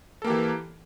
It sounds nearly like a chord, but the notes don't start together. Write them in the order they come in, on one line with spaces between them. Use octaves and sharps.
A4 A#3 G4 E3